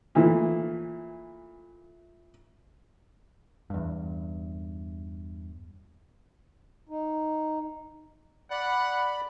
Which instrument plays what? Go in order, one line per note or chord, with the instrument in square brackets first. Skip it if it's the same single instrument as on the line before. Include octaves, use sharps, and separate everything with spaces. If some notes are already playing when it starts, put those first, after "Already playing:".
[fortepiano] A#2 E3 F3 A3
[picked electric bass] E2 G2
[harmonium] D#4
[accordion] D5 B5 [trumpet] F#5